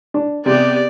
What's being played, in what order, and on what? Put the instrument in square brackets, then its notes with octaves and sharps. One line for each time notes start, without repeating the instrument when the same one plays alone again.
[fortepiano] D4
[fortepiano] C3 [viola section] B3 G4 G#4 [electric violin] D5